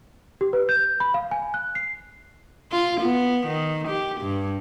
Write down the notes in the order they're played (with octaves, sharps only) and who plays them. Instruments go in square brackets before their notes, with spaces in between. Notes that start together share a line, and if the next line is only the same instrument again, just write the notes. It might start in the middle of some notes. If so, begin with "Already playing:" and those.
[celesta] G4
B4
G6
B5
F5
G#5
F#6
C7
[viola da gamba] F4
B3
D#3
G4
G2